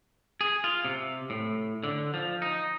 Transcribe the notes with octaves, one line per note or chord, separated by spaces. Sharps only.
G#4
F4
C3
A2
D3
F3
D#4